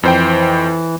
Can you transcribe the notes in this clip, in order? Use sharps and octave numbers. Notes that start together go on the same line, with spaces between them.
F2 E3 C5 G5